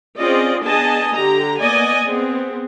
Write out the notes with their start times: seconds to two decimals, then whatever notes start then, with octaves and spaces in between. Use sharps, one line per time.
0.17 C4 C#4 F4 G#4 D5 D#5
0.64 B3 D4 G#4 D#5 G#5 A5
1.13 D3 G4 A#5
1.60 A#3 B3 D5 D#5 G#5
2.04 B3 C4 G#4